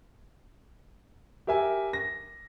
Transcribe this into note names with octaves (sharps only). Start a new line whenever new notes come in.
G4 A#4 E5 G5 G#5
A#6